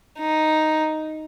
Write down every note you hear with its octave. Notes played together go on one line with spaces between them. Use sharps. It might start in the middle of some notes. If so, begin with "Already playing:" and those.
D#4